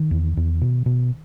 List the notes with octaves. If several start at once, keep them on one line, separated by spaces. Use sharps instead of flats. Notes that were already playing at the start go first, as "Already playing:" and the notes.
Already playing: D#3
E2
E2
B2
B2